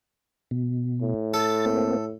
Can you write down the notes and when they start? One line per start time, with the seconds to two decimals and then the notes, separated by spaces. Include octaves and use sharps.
0.51 B2
1.02 A2
1.34 A4 A6
1.65 A#3 C4